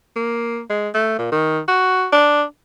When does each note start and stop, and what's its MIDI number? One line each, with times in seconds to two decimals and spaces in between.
0.16 0.61 58
0.70 0.89 56
0.94 1.18 57
1.18 1.29 46
1.32 1.60 51
1.68 2.07 66
2.12 2.43 62